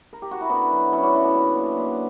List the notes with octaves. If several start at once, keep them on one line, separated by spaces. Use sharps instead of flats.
A#4
G4
F#4
E4
D3 B3 D4
F#3
F#2 C#4 E4
D4 F#4
D3 E4
B3 D4
A#2
A#2
A#2